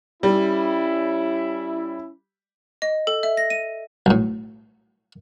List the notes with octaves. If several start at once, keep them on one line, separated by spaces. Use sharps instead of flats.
G3 C#4 E4
D#5
A4
E5
A#6
D#7
B1 A2